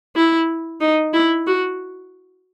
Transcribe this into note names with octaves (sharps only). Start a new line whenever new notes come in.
E4
D#4
E4
F#4